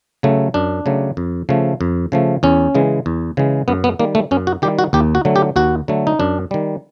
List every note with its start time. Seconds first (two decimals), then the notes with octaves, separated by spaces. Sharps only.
0.23 C#3 F#3 A3
0.54 F#2 D4
0.86 C#3 F#3 A3
1.17 F2
1.49 C#3 F3 A3
1.81 F2
2.12 C#3 F3 A3
2.43 E2 C#4
2.75 C#3 E3 G#3
3.06 E2
3.37 C#3 E3 G#3
3.68 F#2 B3
3.84 B3
3.99 D#3 G3 A#3
4.15 A3
4.31 F#2 C#4
4.47 F#4
4.62 D#3 G3 G4
4.79 F#4
4.93 D#2 G4
5.15 F#4
5.25 D3 F#3 A3
5.36 G4
5.56 D#2 F#4
5.88 D3 F#3 A3
6.07 D#4
6.20 F#2 D4
6.51 D#3 G3